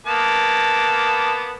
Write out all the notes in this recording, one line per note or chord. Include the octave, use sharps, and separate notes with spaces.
A#3 B3 A5